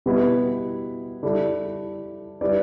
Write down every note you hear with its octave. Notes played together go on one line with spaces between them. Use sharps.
B2 G3 B3 E4
G3 E4 A4 D5
G3 E4 B4 D5